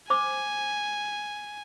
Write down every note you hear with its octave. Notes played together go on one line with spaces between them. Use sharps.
C5 G#5 D6